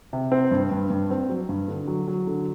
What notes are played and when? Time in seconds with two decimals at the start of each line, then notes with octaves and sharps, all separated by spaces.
0.13 C3
0.32 C4
0.51 G2
0.71 G2
0.90 G2
1.11 C4
1.29 F#3
1.49 G2
1.68 D3
1.88 F#3
2.08 F#3
2.27 D3